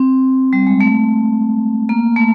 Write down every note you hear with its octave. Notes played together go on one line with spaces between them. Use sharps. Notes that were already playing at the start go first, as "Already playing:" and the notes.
Already playing: C4
G3
G#3
A3
A#3
A3